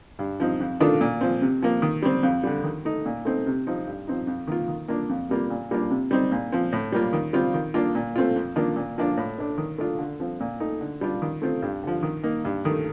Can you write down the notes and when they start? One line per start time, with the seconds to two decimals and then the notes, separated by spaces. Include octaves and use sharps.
0.19 G2
0.40 F3 C4 D#4
0.60 F2
0.80 D#3 A3 D4 F4
1.01 A#2
1.21 F3 C4
1.42 C3
1.62 F3 A#3
1.82 D#3
2.02 G3 C4
2.23 F2
2.43 D3 G3
2.64 D#3
2.85 A3 D#4
3.06 A#2
3.25 A3 C4 D#4
3.47 C3
3.67 F3 C4 D#4
3.87 G2
4.07 F3 C4 D#4
4.27 F2
4.47 D#3 A#3 F4
4.68 D#3
4.88 A#3 D4 F4
5.09 F2
5.29 C3 G3 A#3 F4
5.50 A#2
5.71 G3 A#3 D4 F4
5.90 C3
6.11 G3 C4 D#4
6.32 A#2
6.52 F3 C4
6.73 A2
6.92 G3 A#3 F4
7.13 D#3
7.33 G3 C4 F4
7.54 D#3
7.74 A#3 D4 F4
7.95 A#2
8.16 A3 C4 F4
8.36 F2
8.56 D#3 A#3 D4 F4
8.76 A#2
8.98 F3 A#3 D4 F4
9.17 A2
9.38 A3 D4
9.58 D#3
9.78 A3 D4 F4
9.99 D3
10.20 F3 C4
10.40 A#2
10.60 A3 D#4
10.81 D3
11.01 G3 D4 F4
11.22 D#3
11.42 A3 C4 F4
11.62 G2
11.83 D3 F3
12.03 D#3
12.23 A#3 D#4
12.45 G2
12.65 D#3 A3